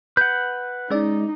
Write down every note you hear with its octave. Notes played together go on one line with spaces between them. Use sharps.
B4 F#5 G6
G#3 C#4 D#4 D5